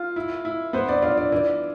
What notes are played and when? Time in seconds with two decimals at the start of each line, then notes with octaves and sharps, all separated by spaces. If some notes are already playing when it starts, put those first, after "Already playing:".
Already playing: F4
0.16 E4
0.45 E4
0.73 B3 C5
0.89 D5
1.02 F4 D5
1.17 D5
1.32 E3 D5